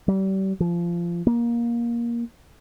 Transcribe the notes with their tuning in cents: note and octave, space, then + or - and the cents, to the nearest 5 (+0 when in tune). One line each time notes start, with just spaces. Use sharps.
G3 -35
F3 -20
A#3 +15